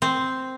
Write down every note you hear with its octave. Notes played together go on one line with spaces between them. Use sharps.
C4